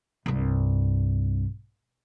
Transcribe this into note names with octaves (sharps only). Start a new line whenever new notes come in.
C2 G2